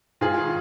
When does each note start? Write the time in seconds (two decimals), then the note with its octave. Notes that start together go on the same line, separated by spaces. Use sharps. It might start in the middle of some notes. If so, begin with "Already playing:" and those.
0.21 G#2 F4 G#4
0.38 D#3